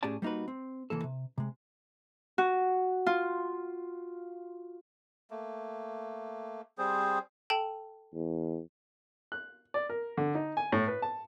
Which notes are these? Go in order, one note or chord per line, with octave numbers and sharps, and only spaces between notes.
A2 C#4 G4 G#4 D5 A5
G3 A#3 D#4 F#4 B4
C4
C2 E3 A#3 A4
C3
C3 G#3
F#4
F4
A3 A#3
G3 C4 G#4 C5
A4 G5 A5
E2
F#6
D5
A#4
D3
D#4
G#5
A2
B4
A5